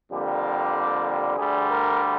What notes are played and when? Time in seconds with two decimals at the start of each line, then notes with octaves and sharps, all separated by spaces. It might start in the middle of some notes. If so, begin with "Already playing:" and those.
0.12 F2 D3 G3 A#3 G4
1.36 D2 D3 G3 G#4
1.69 A#4